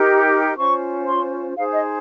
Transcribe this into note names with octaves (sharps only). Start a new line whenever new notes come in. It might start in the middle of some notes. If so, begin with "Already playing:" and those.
Already playing: D#4 G4 A#4
C#4 F4 C5 C#6
C6
D#4 G#4 C5 F5
D#5